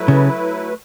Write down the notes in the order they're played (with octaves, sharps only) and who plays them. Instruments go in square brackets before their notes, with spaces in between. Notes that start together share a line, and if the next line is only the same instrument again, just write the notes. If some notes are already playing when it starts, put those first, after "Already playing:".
Already playing: [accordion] F#3 A3 E4 B4
[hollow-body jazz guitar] C#3